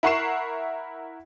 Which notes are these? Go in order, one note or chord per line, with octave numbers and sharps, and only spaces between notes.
E4 A#4 F#5 C#6 C7 E7